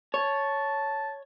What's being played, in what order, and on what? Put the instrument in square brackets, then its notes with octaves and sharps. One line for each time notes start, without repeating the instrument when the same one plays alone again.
[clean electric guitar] C#5 [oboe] A5